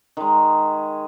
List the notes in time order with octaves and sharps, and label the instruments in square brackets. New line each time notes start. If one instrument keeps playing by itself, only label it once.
[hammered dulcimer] D#3 G#3